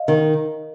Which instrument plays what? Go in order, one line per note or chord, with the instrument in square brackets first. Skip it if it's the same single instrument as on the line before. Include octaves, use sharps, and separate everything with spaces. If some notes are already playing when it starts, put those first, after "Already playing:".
Already playing: [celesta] D#5 F5
[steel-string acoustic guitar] D#3